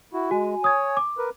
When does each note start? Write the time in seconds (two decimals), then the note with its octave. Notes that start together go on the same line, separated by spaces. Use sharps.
0.13 E4 F#4
0.31 G#3 F#4 G#5
0.64 C#5 D#6 G#6
0.97 D6
1.18 A#4 B4